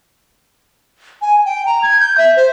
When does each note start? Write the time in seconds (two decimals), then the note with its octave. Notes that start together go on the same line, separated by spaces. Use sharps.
1.22 G#5
1.46 G5
1.66 A#5
1.82 G#6
2.00 G6
2.18 E5
2.36 C5